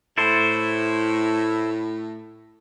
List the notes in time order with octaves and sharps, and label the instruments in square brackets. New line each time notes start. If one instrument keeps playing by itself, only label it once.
[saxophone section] A2 [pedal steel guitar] E4 A4 C5